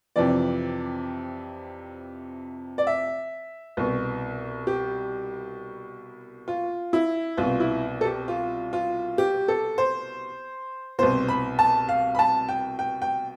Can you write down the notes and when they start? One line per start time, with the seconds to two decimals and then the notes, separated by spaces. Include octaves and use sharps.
0.16 F2 C3 E3 D5
2.78 D5
2.87 E5
3.77 C2 B2
4.67 G4
6.48 F4
6.93 E4
7.37 C2 B2 F4
7.60 E4
8.01 A4
8.05 G4
8.28 F4
8.73 F4
9.18 G4
9.48 A4
9.78 C5
10.99 C2 B2 C5
11.29 B5
11.59 A5
11.89 F5
12.15 B5
12.19 A5
12.49 G5
12.79 G5
13.02 G5